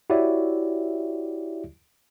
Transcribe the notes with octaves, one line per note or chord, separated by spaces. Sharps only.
E4 F#4 G4 C#5 D5 E5